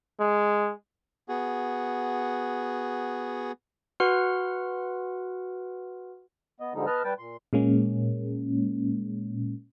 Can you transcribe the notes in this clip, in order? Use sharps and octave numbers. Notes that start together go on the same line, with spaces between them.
G#3
B3 F#4 G#4
F#4 B4 F#5 C6 F6
B3 D#5
G#2 D3 F3 G3 G#3 D#4
B3 B4 D#5 A5 F6
G3 B4 G5 A5
A#2 C6
A#2 G#3 A#3 C#4